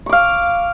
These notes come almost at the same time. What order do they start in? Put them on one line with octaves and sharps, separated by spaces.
C#6 D6 F5